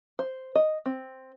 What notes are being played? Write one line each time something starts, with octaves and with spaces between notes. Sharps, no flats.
C5
D#5
C4